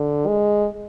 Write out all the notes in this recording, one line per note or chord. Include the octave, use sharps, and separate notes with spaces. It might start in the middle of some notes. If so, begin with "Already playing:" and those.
Already playing: D3
G#3